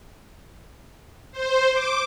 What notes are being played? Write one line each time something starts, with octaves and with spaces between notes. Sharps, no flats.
C5
D6